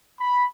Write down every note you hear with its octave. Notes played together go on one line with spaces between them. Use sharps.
B5